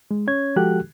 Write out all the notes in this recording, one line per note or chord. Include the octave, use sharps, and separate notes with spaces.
G#3
C#4 C#5 G#6
F3 G#3 F#4 G4 A4 F#6